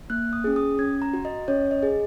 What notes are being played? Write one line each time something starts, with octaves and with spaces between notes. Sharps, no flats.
A#3 F#6
D#6
C#4 G#4
D#6
C#4 G#6
A#5
F#4
D#5
C#4 C#5
D#5
G#4